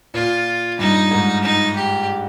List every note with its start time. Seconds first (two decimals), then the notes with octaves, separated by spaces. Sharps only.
0.14 A#2 F4
0.79 G2 D#4
1.11 G#2
1.44 D#4
1.76 G4